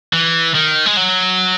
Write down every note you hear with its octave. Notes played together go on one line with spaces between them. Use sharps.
E3
D#3
G#3
F#3